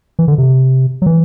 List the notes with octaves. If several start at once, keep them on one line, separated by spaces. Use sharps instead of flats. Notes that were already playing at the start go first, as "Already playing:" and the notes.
E3
D3
C3
F#3
E3